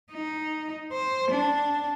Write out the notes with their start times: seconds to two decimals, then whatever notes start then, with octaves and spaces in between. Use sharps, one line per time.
0.13 D#4
0.92 C5
1.31 D4